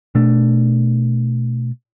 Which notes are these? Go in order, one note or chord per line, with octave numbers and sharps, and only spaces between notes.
B2 A3 D4